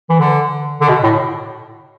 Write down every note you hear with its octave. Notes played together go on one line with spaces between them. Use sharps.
E3
D3
D3
B2
A2